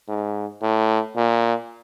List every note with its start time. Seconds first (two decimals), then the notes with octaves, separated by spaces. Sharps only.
0.08 G#2
0.62 A2
1.16 A#2